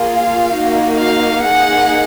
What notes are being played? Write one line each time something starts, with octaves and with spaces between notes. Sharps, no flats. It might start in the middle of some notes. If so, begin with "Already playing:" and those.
Already playing: A#3 F4 G#4
F5
A#3 D#4 F#4
F5
A#3 D#4 G#4 F#5